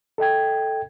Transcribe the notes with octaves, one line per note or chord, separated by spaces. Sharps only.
A4 D#5 G5 G#6